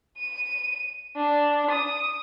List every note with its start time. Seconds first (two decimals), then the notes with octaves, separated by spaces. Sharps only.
0.18 D#7
1.16 D4
1.71 D#6